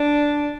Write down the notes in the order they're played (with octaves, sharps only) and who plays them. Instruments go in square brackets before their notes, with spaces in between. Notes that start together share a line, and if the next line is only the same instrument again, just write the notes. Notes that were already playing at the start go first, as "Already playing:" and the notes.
Already playing: [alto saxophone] D4